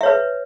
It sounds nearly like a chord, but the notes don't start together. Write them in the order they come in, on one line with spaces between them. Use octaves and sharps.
E5 C#5 B4